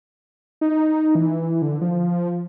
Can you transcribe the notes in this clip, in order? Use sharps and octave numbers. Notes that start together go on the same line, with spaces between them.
D#4
E3
D3
F3